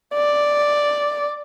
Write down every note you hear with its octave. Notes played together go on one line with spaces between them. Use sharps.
D5